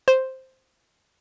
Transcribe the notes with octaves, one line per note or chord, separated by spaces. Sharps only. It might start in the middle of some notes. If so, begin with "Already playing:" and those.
C5